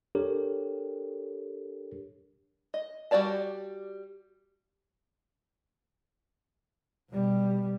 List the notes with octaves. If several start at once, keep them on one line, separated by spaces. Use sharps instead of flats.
D4 G4 A4 A#4 C#5
D#5
G3 F#4 C#5 D5 A5
B2 G3